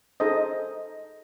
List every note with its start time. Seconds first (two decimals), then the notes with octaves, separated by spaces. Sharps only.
0.20 D#4 G#4 A4 C5 D#5